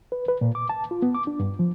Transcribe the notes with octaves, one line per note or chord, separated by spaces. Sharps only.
B4
B4
A#2
D6
A5
F4
B3
D6
D4
G2
F3